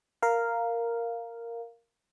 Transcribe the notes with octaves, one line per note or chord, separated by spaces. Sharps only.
A#4 F5